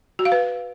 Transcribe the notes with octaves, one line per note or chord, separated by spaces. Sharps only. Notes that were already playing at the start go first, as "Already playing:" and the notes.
F#4
F5
B4